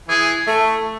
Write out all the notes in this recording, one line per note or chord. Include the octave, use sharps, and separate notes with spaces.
E3 G#4
A3